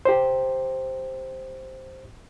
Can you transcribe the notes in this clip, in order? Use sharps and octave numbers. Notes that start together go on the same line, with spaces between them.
G4 C5